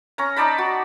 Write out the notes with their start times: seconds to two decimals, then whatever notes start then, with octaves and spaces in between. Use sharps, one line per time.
0.18 C#4 A#5
0.36 D#4 D5 A5 B5
0.58 F#4